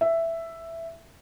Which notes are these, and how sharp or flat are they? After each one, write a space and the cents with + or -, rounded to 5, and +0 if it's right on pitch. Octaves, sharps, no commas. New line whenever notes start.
E5 +5